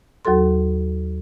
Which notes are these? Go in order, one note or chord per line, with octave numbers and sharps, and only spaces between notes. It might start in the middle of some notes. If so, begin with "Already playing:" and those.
D#2 F#3 F#4 A4 C6